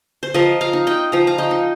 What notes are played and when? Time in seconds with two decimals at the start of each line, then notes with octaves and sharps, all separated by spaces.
0.23 C5
0.34 F3 A#4 D#5
0.61 F5 A#5
0.73 D#4
0.87 D#5 G5
1.12 F3 A#5
1.27 F5 A#5
1.38 D#5 G5
1.51 D#4